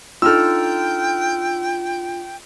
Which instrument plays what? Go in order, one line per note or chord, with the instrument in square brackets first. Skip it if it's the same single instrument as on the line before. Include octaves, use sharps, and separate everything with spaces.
[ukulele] D4 D#4 A4 [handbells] F4 [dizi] G5 [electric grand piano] E6 F6